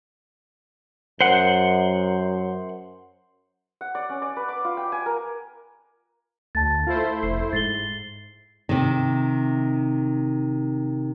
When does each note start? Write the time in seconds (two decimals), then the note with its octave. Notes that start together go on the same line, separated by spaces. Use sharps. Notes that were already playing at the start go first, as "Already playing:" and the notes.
1.21 F#2 C5 F#5
3.81 F#5
3.95 D5
4.09 C#4
4.22 D5
4.37 B4
4.49 D6
4.65 F4
4.77 G5
4.92 G#5
5.06 A#4
6.55 D2 A5 A6
6.87 A3 E4 F4 C5
7.23 F1 C7
7.53 G#2 A6 C7 G7
8.69 C3 D#3